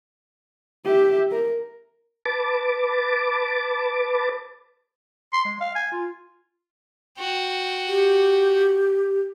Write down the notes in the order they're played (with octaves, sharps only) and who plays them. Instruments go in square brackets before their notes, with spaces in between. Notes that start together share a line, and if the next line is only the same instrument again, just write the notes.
[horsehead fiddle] G4 E5
A#4
[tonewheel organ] B4 A5 D6
[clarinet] C6
G#3
F5
G#5
F4
[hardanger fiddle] F#4 G5
[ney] G4